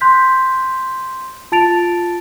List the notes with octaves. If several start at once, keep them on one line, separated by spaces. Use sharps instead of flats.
C6 F#6 G6 B6
F4 A5 A6 D7 F7